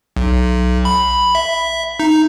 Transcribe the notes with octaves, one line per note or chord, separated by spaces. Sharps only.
B1
B5
E5
D#4